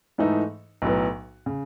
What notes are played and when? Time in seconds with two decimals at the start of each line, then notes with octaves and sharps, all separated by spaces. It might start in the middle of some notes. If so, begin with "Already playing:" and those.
0.18 G#2 E3 A3 D#4 A4
0.82 B1 A2 F#3 B3
1.46 C#3